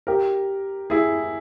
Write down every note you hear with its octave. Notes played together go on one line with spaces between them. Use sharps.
G4 A#4
E4 G#4